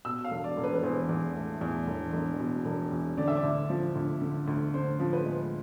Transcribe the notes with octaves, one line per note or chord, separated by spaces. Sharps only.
B2 E6
F5
E1
D5
E1
B4
B4
E2 C5
E2
A3
E2
E1
E1
B2
E1
E2
D3 D5
E5
D5
D2
F3
D2
D3
D2
D3 C5
F3
B4
G#3